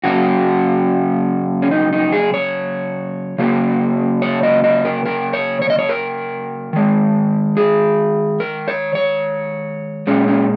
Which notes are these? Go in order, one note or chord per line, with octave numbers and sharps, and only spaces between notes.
C#3 F#3 A#3 F#4
C#4
D#4
D#4
G#4
C#5
C#3 F#3 A#3
C#5
D#5
D#5
A#4
A#4
C#5
C#5
D#5
C#5
A#4
D#3 G#3
G#4
A#4
C#5
C#5
A#2 G#3 C#4
C#4